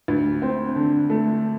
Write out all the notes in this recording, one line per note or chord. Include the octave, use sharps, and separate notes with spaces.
D2
C4
D3
A3